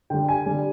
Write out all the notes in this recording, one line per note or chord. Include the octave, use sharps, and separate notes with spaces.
D3 G3 G5
G#5
D3 G3